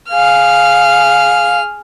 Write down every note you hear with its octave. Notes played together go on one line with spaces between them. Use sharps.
G#4 F5 F6